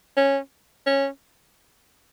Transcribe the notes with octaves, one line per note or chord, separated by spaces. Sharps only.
C#4
C#4